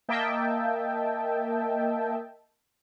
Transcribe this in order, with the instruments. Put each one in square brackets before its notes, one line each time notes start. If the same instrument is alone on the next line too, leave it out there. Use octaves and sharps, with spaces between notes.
[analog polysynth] A#3 D#5 E5 G5 A5